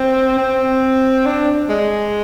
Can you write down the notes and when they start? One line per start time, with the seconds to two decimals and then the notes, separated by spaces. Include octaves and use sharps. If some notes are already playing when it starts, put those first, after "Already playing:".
Already playing: C4
0.38 C4
1.26 D4
1.69 G#3